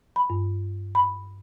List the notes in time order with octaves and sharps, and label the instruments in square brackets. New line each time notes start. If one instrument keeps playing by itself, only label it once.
[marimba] B5
G2
B5